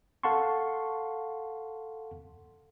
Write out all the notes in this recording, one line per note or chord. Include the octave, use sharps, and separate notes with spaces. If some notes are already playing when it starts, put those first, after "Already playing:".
A4 F5 F#5 A5 C6 C#6